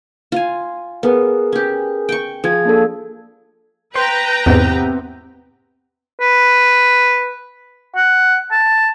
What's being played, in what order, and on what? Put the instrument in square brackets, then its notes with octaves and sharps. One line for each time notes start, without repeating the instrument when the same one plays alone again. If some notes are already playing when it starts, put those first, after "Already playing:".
[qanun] F4 G#5
[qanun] B3 [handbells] G#4 A#4
[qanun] C#4 G4
G5 C#6
[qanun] F3 [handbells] G#4 G#6
[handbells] A#3 D4 A4
[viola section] B4 G5 A#5 [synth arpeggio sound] C5
[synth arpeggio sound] E2 G#2 [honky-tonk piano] C3 B3 C4
[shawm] B4
F#5
A5